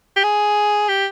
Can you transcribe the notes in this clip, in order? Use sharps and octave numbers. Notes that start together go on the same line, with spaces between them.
G4
G#4
G4